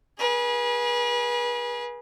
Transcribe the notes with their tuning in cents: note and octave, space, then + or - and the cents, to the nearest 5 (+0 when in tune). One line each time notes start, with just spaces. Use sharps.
G#4 +0 B4 -40